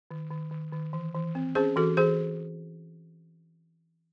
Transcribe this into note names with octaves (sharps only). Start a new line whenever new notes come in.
D#3
D#3
D#3
D#3
E3
E3
C4
C#4 G#4 C5
E3 F#4 A4
E3 G#4 C5